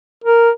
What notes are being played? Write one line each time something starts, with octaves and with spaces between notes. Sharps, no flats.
A#4